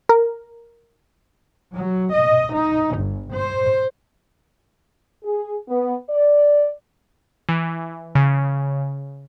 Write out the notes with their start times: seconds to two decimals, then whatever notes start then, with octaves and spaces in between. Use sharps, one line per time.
0.09 A#4
1.74 F#3
2.13 D#5
2.55 D#4
2.98 G1
3.35 C5
5.24 G#4
5.69 B3
6.10 D5
7.49 E3
8.15 C#3